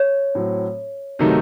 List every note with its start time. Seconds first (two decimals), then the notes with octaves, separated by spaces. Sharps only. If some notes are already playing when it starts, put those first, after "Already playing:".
Already playing: C#5
0.35 A2 F#3 C4
1.19 C3 D#3 F#3 A3 D#4